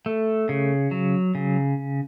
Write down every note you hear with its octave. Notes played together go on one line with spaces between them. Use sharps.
A3
C#3
F#3
C#3